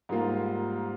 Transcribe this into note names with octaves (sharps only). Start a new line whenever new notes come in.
G#2 G3 A#3 F4